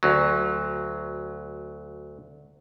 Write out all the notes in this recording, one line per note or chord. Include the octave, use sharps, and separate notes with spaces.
D2 F#3